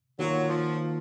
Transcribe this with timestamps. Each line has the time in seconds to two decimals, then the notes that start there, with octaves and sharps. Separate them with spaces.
0.18 D#3 F#3 A#3 F4
0.47 F3